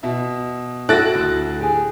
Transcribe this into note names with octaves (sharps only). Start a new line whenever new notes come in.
B2 E5
E4 F#4 A4 F#6 A6 A#6 D7
D2
G4 G#4